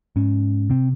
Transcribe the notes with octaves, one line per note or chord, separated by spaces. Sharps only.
G#2 C#4
C3 C4